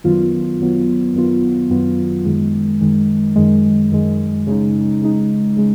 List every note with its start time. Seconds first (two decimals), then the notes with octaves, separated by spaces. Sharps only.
0.04 F#2 D#3 F#3 B3 F4
0.60 F#2 D#3 F#3 B3 F4
1.14 F#2 D#3 F#3 B3 F4
1.70 F#2 D#3 F#3 B3 F4
2.25 F#2 D#3 G#3
2.81 F#2 D#3 G#3
3.36 F#2 D#3 G#3
3.91 F#2 D#3 G#3
4.47 C#3 G#3 D#4
5.02 C#3 G#3 D#4
5.57 C#3 G#3